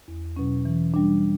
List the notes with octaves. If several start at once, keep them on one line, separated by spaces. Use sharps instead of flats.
E2
B2 F#3 C#4
E3
G3 D4